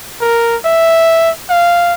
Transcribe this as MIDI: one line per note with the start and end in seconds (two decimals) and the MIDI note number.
0.21 0.56 70
0.65 1.30 76
1.49 1.94 77